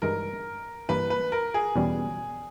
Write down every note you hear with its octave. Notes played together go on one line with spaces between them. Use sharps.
G2 E3 G#3 D#4 A#4
G2 E3 A#3 B4
B4
A#4
G#4
E2 B2 G3 C#4